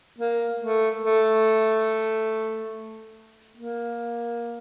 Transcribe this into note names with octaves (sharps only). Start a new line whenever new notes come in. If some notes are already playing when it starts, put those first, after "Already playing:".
A#3
A3
A3
A#3